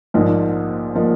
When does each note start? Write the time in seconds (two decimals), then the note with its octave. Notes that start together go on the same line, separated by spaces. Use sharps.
0.14 A#1 G#2 F3 A#3 D#4
0.95 F3 A#3 D#4